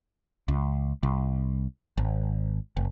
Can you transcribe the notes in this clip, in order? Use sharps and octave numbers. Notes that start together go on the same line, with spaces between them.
C#2
C2
G#1
F#1